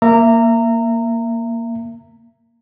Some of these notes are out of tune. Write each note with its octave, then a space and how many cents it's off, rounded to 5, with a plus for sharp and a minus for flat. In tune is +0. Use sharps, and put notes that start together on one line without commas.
A#3 +0 E5 +25 A#5 -20